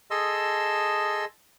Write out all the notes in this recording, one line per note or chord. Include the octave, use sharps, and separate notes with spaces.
G#4 A4 D#5 A5 C6 E6